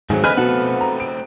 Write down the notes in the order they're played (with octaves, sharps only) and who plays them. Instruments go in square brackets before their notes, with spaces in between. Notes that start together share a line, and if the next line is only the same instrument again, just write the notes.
[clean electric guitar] G#2 D#3 F#3 [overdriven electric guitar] A3 C4 [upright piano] G#4
[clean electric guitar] D3 D#5 G#5 [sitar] B4 [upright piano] F6
[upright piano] B2 [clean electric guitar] F#4 A4 F#5
[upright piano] A#5
D7